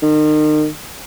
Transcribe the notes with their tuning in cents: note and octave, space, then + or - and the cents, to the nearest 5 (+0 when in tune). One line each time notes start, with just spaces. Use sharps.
D#3 -35